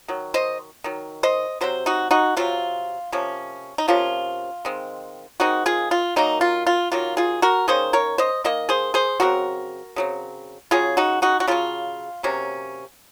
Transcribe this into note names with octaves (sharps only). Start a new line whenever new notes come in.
D#3 F#3
C5 D#5
D#3 F#3
C5 D#5
C3 F#3 C4 C5
D#4 F#4
D#4 F#4
C3 F#3 C4 F4
C3 F3 A#3 C#4
D#4
C3 F3 A#3 C#4 F4
D#3 G#3 C4
D#3 G#3 C4 D#4 F#4
F4 G#4
F4
D#3 F#3 A#3 D#4
F4
F4
D#3 F#3 A#3 F4
F4 G#4
F#4 A#4
D#3 A#3 C#4 G#4 C5
A#4 C#5
C5 D#5
D#3 A#3 D#5
G#4 C5
G#4 C5
C#3 F#3 C4 F#4 A#4
C#3 F#3 C4
C#3 F#3 C#4 F4 G#4
D#4 F#4
D#4 F#4
F#4
C#3 F#3 C#4 F4
C3 F#3 A#3 C#4